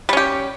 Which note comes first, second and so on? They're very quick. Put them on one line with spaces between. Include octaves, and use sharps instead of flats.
G3 C#4 G4